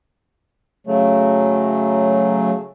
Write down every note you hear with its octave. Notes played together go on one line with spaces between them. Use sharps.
C#3 F#3 A3